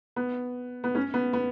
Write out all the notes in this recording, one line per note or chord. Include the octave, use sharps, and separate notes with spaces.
B3
B3
C#4
B3
B3